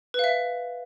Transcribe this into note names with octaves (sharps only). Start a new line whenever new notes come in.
B4 E5 F5